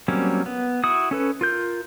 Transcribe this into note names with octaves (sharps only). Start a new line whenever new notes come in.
F#3 G3 A#3 C4 C#4
B3
E4 F#4 D#6
C#4 A4 B4
F4 A#4 G6